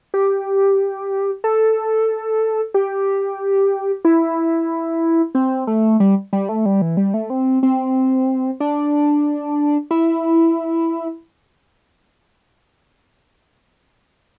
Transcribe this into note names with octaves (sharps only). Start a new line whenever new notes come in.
G4
A4
G4
E4
C4
A3
G3
G3
A3
G3
E3
G3
A3
C4
C4
D4
E4